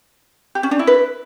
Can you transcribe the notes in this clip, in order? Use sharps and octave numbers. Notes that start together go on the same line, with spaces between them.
G4
C#4
D4
E4
B4